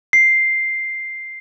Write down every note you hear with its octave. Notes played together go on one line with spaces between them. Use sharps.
C7